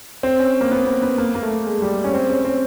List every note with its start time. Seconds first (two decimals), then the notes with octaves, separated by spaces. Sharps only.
0.23 C4
0.39 C#4
0.61 A#3
0.71 B3
0.86 B3
1.02 B3
1.18 A#3
1.35 A#3
1.42 A3
1.66 G#3
1.82 G3
2.04 C#4
2.14 C4
2.29 C#4
2.45 C4